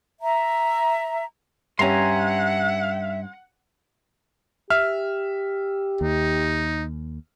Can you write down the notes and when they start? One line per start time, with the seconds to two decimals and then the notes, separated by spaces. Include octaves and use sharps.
0.21 E5 A#5
1.79 G2 C#4 E5 F#5 G#5 A#5 C6
4.70 G4 E5 F6
6.01 D#2 D#4